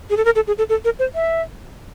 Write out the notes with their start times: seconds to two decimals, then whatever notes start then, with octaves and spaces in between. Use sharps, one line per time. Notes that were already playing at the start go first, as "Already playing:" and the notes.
0.10 G#4
0.17 A4
0.25 A#4
0.35 A4
0.47 G#4
0.58 A4
0.69 A4
0.85 A#4
0.99 C5
1.15 E5